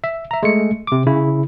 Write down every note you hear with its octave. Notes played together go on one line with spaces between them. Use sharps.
E5
E5 A#5
G#3 A3 C#7
C3 D6
C#3 E4